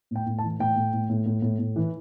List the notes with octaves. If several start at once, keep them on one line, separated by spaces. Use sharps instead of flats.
A2 G5
A2
A5
E3
A2 G5
A2
A2
A2
A2
A2
A2
E3